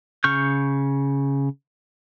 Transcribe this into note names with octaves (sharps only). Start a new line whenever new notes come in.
C#3 C#6 F6 G6